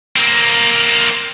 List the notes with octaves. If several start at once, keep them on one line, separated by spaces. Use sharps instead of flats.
A#3 C4